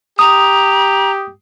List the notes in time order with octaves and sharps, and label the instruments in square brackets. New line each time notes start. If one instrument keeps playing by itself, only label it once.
[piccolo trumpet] G4 [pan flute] A#5 [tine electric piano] D#6